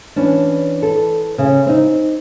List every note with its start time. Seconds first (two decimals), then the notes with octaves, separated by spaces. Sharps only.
0.16 E3 C#4 D4
0.82 A4
1.38 C#3
1.66 C4 D#4